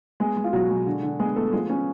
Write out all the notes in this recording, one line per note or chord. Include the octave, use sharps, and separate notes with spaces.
G#3 B3 G#4
G#3
F4
B2 F#3 F#4
G#3
D3
D3
G#3 B3 G#4
A3 B3 A4
F3 G#3 G#4
B3 C#4